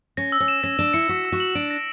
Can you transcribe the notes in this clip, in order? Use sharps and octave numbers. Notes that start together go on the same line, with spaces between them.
C#4 A#6
E6
C#4
E7
C#4 A#6
D4 E7
E4 C#7
F#4 B6
E6
F#4
F#7
D4 D7
A#6